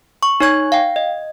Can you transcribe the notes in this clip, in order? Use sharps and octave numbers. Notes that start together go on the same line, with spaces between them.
C#6
D#4 C#5 C#6 G#6
F5 G5
D#5